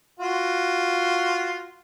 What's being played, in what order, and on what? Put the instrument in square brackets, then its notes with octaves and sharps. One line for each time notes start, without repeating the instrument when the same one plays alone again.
[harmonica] F4 F#4